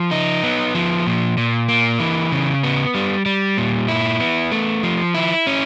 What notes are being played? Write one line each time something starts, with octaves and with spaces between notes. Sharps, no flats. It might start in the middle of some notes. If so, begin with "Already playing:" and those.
Already playing: F3
D#4
B3
F3
A#2
A#2
A#3
E3
C#3
B3
G3
G3
A#2
E4
B3
A3
F3
E4
C#4